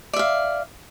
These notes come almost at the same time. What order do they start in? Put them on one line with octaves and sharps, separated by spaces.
D5 E5 F5